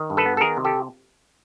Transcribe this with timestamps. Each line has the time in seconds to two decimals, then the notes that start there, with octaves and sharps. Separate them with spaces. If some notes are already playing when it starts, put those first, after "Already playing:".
Already playing: D#3
0.10 G2
0.17 A4 B4
0.26 B3
0.37 A4
0.41 D#3 G#4 A#4
0.57 C3
0.65 G4 A4